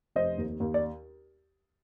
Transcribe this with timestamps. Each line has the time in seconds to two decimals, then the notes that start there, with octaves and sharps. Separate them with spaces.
0.16 F1 C5 D#5
0.38 D#2
0.60 D#2
0.74 D5